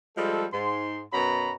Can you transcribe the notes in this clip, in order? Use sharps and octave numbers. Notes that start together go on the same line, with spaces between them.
F3 G3 G#3 A4
G#2 C6
F#2 B2 F#3 F#4 A#5 B5